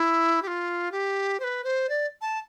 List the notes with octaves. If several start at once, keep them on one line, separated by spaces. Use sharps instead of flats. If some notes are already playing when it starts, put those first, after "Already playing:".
Already playing: E4
G4
F4
G4
C5
B4
C5
D5
A5